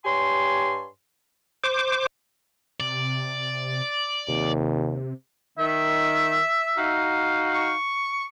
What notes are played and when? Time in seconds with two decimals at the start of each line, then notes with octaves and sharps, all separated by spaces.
0.05 G2 G4 C#5 G#5 C6
1.64 C5 D6
2.80 C3 D5
4.29 D#2 C3
5.58 D#3 E5
6.78 D#4 F#4 F5
7.53 C#6